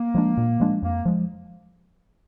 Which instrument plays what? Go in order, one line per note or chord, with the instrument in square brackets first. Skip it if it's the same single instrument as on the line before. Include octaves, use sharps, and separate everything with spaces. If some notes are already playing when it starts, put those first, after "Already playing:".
Already playing: [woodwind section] A#3
[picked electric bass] F3 G#3 D4
A#2
F3 G#3 D4
[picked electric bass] F2 [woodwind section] A#3
[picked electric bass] F3 G#3